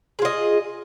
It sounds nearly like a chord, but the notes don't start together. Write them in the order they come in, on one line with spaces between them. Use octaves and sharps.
G#4 F4 D#5